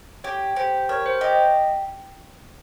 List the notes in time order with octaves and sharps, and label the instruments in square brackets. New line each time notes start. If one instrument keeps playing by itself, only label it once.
[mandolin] G4 [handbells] C#5
[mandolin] G4 [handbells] C5
[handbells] A#4 [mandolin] C#5
[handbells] C5
[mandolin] G4 [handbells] D#5
[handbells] D#5